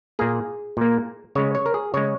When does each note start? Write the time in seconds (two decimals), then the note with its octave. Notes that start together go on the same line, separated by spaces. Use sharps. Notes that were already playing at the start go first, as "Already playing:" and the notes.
0.19 A#2 A#3 G#4
0.77 A#2 A#3
1.35 C#3 G#3 C#5
1.55 C#5
1.66 A#4
1.74 G#4
1.94 C#3 G#3 C#5